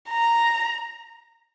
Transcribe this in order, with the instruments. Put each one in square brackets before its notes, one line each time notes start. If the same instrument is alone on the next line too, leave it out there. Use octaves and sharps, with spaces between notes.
[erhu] A#5